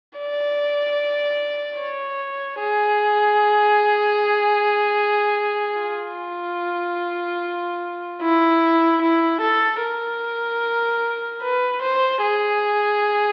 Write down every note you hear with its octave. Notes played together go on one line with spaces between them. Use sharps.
D5
C#5
G#4
F4
E4
E4
A4
A#4
B4
C5
G#4